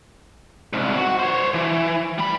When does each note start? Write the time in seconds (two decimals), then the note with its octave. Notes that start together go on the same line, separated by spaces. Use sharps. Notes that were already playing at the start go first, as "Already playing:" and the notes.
0.73 C2 G#2
0.97 F#4
1.19 C5 C#5
1.54 E3
2.18 G3 B5